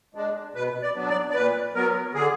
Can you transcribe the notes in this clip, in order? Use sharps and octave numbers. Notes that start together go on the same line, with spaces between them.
G#3 D4
B2 B4
D5
F#3 B3 D4
D5
D5
A#2 B4
F#3 B3 A#4
D3 G#4